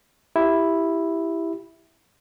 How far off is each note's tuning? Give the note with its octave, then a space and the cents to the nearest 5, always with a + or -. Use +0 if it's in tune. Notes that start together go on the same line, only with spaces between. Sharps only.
E4 +0 G4 +0